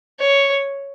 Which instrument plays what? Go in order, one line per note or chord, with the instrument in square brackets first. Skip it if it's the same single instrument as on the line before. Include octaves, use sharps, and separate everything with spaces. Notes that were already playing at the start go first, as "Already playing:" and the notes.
[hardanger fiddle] C#5